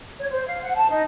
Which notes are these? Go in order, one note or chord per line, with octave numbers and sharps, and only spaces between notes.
C#5
C5
F5
F#5
A5
D#4